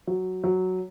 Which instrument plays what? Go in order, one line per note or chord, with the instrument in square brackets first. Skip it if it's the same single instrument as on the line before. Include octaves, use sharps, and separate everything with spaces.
[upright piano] F#3
F#3